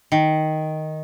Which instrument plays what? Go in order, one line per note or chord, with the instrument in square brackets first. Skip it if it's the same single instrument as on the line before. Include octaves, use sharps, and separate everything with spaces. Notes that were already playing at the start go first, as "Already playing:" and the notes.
[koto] D#3